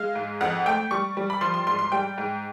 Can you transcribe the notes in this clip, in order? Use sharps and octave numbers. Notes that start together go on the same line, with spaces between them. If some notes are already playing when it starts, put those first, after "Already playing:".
Already playing: G#3 F5
G#2
F2 F#5
A3 G5
G3 C#6
G3
B5
F3 C6
C6
G#2 C6
C6
G3 G5
G#2